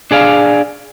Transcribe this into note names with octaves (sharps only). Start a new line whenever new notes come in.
D4 G#4 D5 F5